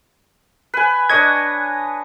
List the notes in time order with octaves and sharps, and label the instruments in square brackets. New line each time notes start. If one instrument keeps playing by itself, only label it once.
[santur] B4 G#5
[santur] D4 C#5 D#5 [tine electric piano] G#6